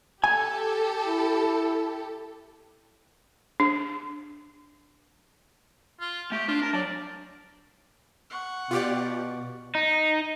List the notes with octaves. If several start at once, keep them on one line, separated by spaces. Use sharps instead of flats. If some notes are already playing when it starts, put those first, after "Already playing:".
G4 A4 G#5
E4
D4
F4
A3 G4
D4 F4
A#4 A5
F#3 D5
F#5 C#6
B2 F4 G4 D5
D#4